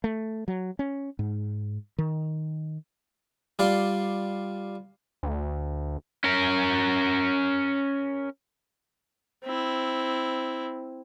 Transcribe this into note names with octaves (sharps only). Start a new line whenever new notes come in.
A3
F#3
C#4
G#2
D#3
G3 F4 D5 C6
D2
C#4 A#4
C4 E4